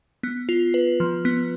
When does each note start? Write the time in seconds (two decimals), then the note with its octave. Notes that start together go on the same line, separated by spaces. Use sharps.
0.23 B3
0.49 F4
0.74 B4
1.00 F3
1.25 B3